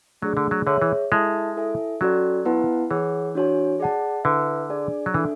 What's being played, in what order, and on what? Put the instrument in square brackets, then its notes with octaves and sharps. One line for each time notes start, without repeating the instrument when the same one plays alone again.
[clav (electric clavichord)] F#3 [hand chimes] A3 D4 G#4 D5
[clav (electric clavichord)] D3
F#3
[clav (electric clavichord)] D3 [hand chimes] G#4 C#5 E5
[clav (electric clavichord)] E3
[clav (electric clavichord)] G#3 [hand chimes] E4 A4 E5 A5
[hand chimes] E4 A4 E5 G#5
[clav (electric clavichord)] F#3 [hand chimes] C#4 F#4 A4 D5
[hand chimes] B3 E4 B4 F#5 A5
[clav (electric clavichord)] E3 [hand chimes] G#4 C#5 F#5
[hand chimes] D4 F#4 C#5 G#5
G#4 D5 F#5 A5
[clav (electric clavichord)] D3 [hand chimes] E4 B4 E5
[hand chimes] D4 G#4 D5 G#5
[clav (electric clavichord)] F#3
[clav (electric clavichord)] E3 [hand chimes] D4 A4 E5 G#5